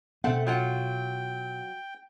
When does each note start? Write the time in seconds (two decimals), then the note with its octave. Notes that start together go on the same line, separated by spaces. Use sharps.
0.24 B2 A3 B3 C4 F#5
0.47 F#3 F4 F#5 G5